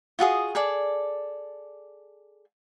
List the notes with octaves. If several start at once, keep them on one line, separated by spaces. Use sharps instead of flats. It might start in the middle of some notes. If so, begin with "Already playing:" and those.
F4 F#4 G#4 D#6
G#4 A4 D5